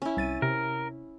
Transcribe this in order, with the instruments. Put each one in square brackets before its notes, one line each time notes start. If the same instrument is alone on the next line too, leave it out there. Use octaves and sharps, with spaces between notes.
[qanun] C#4 E4
[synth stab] C2 A6 D#7
[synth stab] C3 [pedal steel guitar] A#4